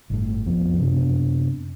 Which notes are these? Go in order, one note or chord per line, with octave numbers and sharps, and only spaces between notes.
G1 A2
B1 F2 F3 B3
F#2 C3 B3 D4